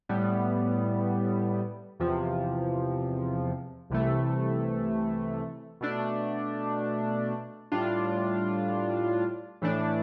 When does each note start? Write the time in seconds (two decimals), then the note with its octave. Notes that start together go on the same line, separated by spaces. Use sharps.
0.09 A2 G3 B3
1.99 E2 C3 F3
3.90 C2 C3 E3 A3
5.81 B2 A3 D4
7.72 A2 G3 D4 F4
9.62 A2 E3 A3 D4